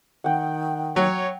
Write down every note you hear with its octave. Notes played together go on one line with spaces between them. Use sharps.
D#3 F#5 G5
F#3 C#5